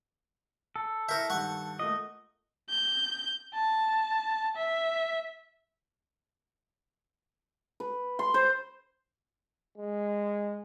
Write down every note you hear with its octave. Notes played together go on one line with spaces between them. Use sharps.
A4
E4 A#4 E5 C#6 G6
G2 D#3 F#5 C#6
A3 A#3 F4 D#5
G6
A5
E5
B4
C6
C5
G#3